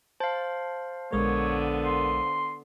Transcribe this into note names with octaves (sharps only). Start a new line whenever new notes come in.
C5 F5 A5
A#1 D3 G#3 B3 A#4 C#5
C6